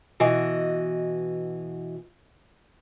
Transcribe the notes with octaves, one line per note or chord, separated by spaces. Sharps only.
B2 E3 F#4 D#5